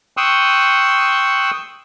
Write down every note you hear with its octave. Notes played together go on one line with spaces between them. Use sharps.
G5 C6 C#6 D#6 E6 F#6